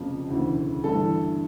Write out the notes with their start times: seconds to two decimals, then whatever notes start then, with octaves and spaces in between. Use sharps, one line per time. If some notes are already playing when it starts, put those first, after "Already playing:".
Already playing: F1 F2 C#3 F3 A#3
0.28 E1 D2 C#3 E3
0.83 G1 G2 E3 A3 A4